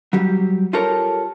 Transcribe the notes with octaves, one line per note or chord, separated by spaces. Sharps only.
F#3 G3 G4
F4 G4 A4 A#4 C#5